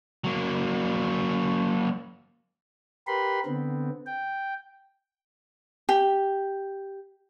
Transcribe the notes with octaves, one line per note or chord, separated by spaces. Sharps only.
F#3 A#3
G4 A#4 B4 B5 C6
D3 B3 C4
G5
G4